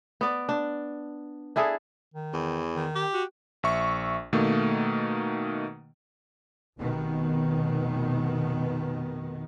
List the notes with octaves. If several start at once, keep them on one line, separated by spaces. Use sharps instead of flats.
B3 D5
D4
D4 E4 G#4 A4
D#3
E2
D#3
G4
F#4
A#1 E5 C#6
B2 D#3 A3 A#3
F1 B2 D#3 B3